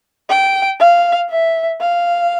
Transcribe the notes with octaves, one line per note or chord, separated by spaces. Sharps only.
G5
F5
E5
F5